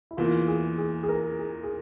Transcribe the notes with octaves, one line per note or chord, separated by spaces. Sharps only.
E4
E2 E3 A#3 F4
G#4
G#4
G#4
A#4
G#4
G#4